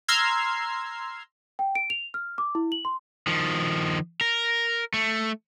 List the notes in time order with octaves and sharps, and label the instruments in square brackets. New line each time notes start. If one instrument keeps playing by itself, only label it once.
[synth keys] A#5 C6 E6 F6 G#6 C7
[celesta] G5
D7
F7
F6
D6
E4
F#7
C6
[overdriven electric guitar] D#3 F3
A#4
A3